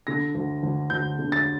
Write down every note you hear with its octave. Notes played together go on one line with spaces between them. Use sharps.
D3 A#6
D2
D2
D2 G6
D3
A6